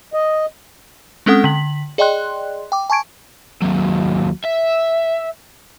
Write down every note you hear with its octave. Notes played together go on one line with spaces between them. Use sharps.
D#5
G#3 C4 C#4 A4 F#5 D#6
D3 B6 F#7
G#4 D5 D#5 G5 C6 F#6
G5 D6
G#5 A5 C#6 G#6 D7
D#2 F#3
E5